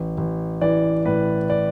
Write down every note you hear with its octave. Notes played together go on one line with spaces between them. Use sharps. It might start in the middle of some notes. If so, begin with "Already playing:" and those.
Already playing: A1
A1
E3 D5
A2 B4
D5